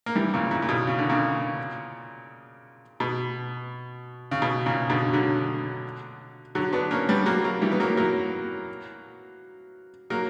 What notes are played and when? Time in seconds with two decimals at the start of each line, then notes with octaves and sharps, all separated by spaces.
0.06 A#3
0.15 E3 G3
0.34 A#2 C#3
0.51 A#2
0.62 A#2
0.69 B2
0.87 C#3
0.99 D3
1.09 A#2 C#3
3.00 B2
4.31 C#3
4.42 B2
4.66 A#2 C#3
4.90 B2 D3
5.13 D3 F#3
6.55 D3 F#3
6.73 B3 D4
6.91 A#3 C#4
7.08 G3 B3
7.26 F#3 A#3
7.44 F#3 A#3
7.62 E3 G3
7.72 B3
7.80 F#3 A#3
7.97 F#3 A#3
10.10 F#3 A#3